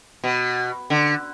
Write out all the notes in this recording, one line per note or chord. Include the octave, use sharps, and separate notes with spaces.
B2
D3